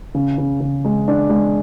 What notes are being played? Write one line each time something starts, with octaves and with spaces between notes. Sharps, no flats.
C#3
C#3
C#3
G#3
D4
G#3